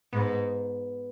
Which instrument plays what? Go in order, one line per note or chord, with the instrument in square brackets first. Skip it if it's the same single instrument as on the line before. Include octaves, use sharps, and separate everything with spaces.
[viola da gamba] G#2 [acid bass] B3